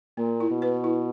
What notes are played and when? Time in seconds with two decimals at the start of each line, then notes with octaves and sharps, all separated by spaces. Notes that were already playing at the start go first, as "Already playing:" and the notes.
0.17 A#2 A#3
0.40 E4
0.51 B2
0.62 B4
0.84 E4